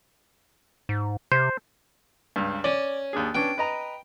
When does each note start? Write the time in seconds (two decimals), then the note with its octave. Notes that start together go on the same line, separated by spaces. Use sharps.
0.89 G#2
1.32 C3 C5
2.36 C#2 G2
2.64 C#4 D5
3.13 D#2 D4 G#4
3.35 B3 C#4 D4 G5
3.58 B4 D#5 A#5